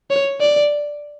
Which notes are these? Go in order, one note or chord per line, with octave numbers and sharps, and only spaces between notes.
C#5
D5